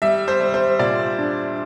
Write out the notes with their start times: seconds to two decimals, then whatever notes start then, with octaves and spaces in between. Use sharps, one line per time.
0.02 G3 E5
0.28 C5
0.41 G3
0.54 C5
0.79 A#2 D5
1.18 D4